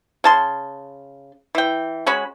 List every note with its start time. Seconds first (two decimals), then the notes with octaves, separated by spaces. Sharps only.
0.24 C#3 A5 C6
1.55 E3 G5
2.06 G#3 C#4 F#4 B5